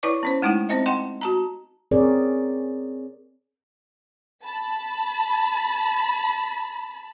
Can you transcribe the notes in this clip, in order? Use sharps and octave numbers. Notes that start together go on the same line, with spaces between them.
E4 B4 C#5 D5 C#6 D6
B3 C#4 C5
G#3 A3 D#4 E4 F#5
B3 C4 C5 D#5 E5
D#5 F#5 G5 C6
F#4 A5 A#5
C4 G#4 A#4 C#5 D5
A5 B5